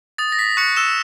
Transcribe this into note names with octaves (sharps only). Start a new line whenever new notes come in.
D#6 A6
A#6
B6
C#6 F#6 C#7
E6 E7